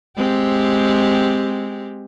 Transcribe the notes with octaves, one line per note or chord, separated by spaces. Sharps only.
G#3 C4 G4